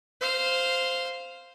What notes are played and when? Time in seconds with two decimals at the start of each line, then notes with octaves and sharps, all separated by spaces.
0.21 C5 F5